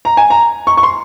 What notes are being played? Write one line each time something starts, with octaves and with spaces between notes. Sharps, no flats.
A#5
G#5
A#5
C#6
C#6
C6